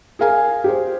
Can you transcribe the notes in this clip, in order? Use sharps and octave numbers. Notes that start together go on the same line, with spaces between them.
G#4 A#4 F5 G#5
G4 G#4 C5